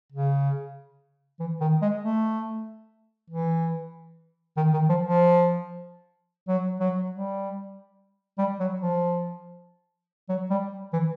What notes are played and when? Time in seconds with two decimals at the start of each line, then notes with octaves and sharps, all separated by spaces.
0.12 C#3
1.40 E3
1.61 D#3
1.82 G#3
2.03 A3
3.30 E3
4.57 D#3
4.73 D#3
4.89 F3
5.05 F3
6.48 F#3
6.80 F#3
7.11 G3
8.38 G3
8.60 F#3
8.81 F3
10.29 F#3
10.50 G3
10.93 E3